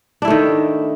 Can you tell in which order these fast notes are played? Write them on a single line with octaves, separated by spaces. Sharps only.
D4 E4 A3 D#3